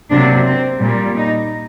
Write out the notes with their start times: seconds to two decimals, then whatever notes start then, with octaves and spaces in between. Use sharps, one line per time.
0.10 C3 F#3 A#3 D4
0.46 C4
0.81 A#2 G3 A#3
1.17 D#4